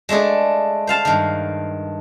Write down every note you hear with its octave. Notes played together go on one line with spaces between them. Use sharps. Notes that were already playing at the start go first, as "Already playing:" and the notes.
G#3 A3 D4 G#4
C5 F5 A5
G2 D#3